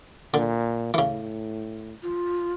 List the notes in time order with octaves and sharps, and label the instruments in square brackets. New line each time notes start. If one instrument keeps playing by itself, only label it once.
[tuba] A#2 [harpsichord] D3
[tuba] A2 [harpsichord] C#3 E3
[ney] F4